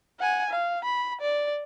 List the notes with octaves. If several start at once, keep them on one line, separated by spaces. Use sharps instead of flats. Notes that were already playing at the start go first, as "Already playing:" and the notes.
F#5 G#5
F5
B5
D5